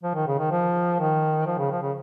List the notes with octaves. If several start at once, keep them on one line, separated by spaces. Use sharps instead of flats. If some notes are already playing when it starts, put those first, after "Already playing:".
F3
D#3
C#3
D#3
F3
D#3
F3
C#3
F3
C#3